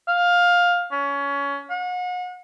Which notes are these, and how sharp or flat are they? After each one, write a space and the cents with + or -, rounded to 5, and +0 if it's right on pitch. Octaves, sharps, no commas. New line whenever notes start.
F5 +15
C#4 +20
F#5 -40